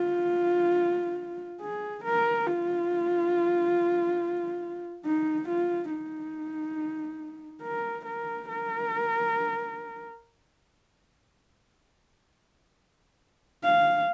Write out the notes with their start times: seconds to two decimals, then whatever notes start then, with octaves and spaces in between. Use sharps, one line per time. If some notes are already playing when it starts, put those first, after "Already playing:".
Already playing: F4
1.61 G#4
2.05 A#4
2.47 F4
5.05 D#4
5.49 F4
5.92 D#4
7.63 A#4
8.06 A#4
8.49 A#4
13.64 F5